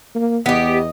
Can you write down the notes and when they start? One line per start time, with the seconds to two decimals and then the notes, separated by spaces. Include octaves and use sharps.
0.15 A#3
0.46 E2 B3 G4 D#5